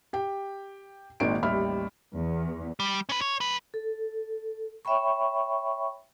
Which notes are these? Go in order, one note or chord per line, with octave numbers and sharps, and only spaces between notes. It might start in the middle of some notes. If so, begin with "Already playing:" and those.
G4 G5
G#1 A#2 D#3 C4 D7
A1 D#2 G3 E5 B5 F6
E2
G3
C#4 B4
C#5
F#2 B4
A4
C#5 E5 G5 B5 C#6